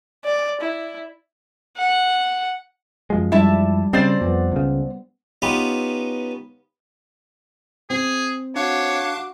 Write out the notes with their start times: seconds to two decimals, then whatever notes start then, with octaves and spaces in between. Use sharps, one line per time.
0.25 D5
0.61 E4
1.77 F#5
3.10 F#2 F3 G#3
3.32 G3 D4 E4 E5 A5
3.93 C#3 G3 C4 C5 D5
4.21 F2 B3
4.52 C#2 C#3
5.42 B3 C#4 D#4 F4 G4 B4
7.90 C4 G#4
8.56 D4 F#4 C#5 F5 D6 F#6